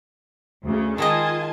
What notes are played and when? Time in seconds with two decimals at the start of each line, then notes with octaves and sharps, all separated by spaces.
0.64 D2 C#3
0.98 D#3 G#3 F4 D#5 G#5 A5